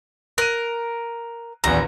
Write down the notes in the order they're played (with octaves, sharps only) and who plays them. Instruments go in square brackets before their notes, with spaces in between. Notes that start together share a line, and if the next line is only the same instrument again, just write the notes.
[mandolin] A#4 [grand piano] F#6 D#7
[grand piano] D#1 A#1 E2 [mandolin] A#5